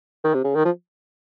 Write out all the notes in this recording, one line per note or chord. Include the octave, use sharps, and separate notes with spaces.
D#3
C3
C#3
D#3
F3